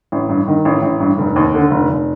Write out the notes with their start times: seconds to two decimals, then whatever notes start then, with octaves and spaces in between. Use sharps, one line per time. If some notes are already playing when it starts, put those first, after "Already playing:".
0.12 A1
0.29 G2
0.48 D#3
0.65 A1
0.82 A1
1.00 G2
1.18 F1
1.36 D#2
1.54 D3
1.71 F1
1.89 F1